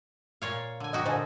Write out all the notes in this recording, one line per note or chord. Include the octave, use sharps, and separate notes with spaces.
A#2 C#5 F5
D3 G#5
D#4 F#4 G4 D#5
A#2 D3 C5 D#5 G#5